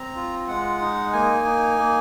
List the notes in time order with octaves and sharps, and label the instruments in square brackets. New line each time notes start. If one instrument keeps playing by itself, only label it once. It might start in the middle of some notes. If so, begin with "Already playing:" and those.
Already playing: [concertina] C4 A#5
F4
G#3 F#5
D#4
A#3 G#5
D#4
A#3